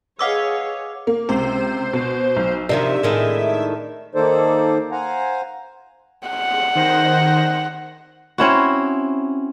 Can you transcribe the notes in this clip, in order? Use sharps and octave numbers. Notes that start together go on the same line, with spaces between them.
G#4 B4 C#5 D#5 F5 F#5 D6 E6
A#3
C#2 C3 C5
B2
B1
C3 D#3 F3 D4 E5
A2 D#3 G#3
D#3 A#3 D#4 A4 C5 D5
C5 F5 F#5 G#5 A#5
F#5
D#3 C5 A#6
C4 C#4 E4 F#4